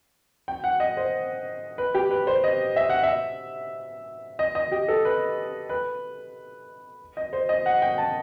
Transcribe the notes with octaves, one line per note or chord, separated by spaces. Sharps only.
G5
F#5
D#5
C5
B4
G4
B4
C5
D#5
E5
F#5
E5
D#5
D#5
G4
A4
B4
B4
D#5
C5
D#5
F#5
G5
A5